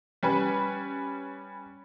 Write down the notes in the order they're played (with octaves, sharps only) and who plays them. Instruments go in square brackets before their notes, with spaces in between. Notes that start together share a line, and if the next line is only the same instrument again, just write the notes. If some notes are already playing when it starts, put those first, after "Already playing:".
[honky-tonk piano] G3 C#4 B4